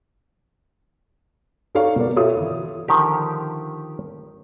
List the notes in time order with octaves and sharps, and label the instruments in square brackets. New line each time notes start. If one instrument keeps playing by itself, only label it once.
[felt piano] D#4 A4 C#5 D5 F5 C#6
B2 A#4 B4 D5
F4 G4 A4 C#5 E5 D#6
E3 E4
[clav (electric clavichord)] D3 D#3 F3 G4